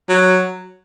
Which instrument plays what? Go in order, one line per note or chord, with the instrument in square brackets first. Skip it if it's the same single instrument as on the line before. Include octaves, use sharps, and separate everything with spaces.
[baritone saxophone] F#3